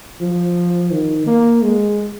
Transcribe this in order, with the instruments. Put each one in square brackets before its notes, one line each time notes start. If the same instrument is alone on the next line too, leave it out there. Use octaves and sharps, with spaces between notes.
[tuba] F3
D#3
A#3
G#3